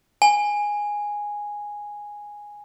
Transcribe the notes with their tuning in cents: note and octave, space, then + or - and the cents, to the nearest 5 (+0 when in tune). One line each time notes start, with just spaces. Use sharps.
G#5 -5